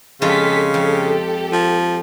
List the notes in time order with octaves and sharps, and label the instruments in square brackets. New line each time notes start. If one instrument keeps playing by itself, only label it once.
[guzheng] F2 G#3 F4 [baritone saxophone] C#3 [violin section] G4 A4 B6
[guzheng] F2 [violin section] G4 A4
[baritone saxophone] F3